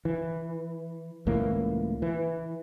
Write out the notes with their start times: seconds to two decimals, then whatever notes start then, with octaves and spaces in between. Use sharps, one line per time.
0.05 E3
1.27 C#2 A2 E3 A#3
2.02 E3